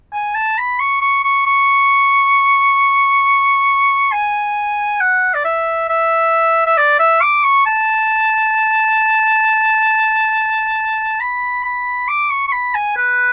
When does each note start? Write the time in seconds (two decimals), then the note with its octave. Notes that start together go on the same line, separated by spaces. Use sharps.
0.13 G#5
0.35 A5
0.58 B5
0.79 C#6
1.01 C#6
1.24 C#6
1.46 C#6
4.12 G#5
5.00 F#5
5.34 D5
5.44 E5
5.89 E5
6.66 E5
6.77 D5
6.99 E5
7.21 D6
7.43 C#6
7.66 A5
11.20 B5
11.64 B5
12.08 D6
12.30 C#6
12.47 C#6
12.52 B5
12.74 G#5
12.96 B4